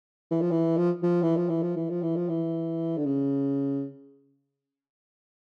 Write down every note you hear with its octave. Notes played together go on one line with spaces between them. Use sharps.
E3
F3
E3
F3
F3
E3
F3
E3
F3
E3
F3
E3
F3
E3
D3
C#3